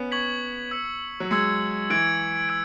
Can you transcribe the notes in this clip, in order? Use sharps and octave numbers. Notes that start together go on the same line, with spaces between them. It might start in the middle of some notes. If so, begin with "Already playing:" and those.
Already playing: B3 C#4
C#6 G#6 B6 F#7
E6 G#6 C#7
F#3
G#3 E6 G#6 C#7
E3 E6 G#6 D7
E6 G#6 D7